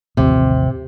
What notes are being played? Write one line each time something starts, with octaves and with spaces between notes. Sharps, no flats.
A1 D#2 C3 F3